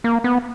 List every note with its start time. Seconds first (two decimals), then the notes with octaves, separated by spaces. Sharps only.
0.04 A#3
0.24 B3